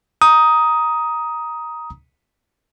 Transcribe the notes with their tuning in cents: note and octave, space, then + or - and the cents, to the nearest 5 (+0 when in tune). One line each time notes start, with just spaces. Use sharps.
A#5 +10 D#6 +10